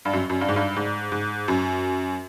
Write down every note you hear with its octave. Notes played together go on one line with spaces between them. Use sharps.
G2
F#2
F#2
G2
G#2
G2
G#2
G#2
F#2